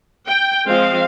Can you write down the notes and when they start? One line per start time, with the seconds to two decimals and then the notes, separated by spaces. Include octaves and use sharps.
0.26 G5
0.67 F3 G#3 C4 F5